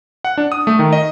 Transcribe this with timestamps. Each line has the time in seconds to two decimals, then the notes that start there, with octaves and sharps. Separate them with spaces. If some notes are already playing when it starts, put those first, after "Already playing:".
0.25 F#5
0.38 D4
0.52 D#6
0.67 A3
0.79 D#3
0.93 D#5